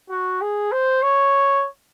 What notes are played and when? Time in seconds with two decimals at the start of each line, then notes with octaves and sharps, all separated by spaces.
0.10 F#4
0.42 G#4
0.72 C5
1.03 C#5